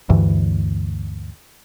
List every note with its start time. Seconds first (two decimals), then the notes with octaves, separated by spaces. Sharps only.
0.10 D2 G2 E3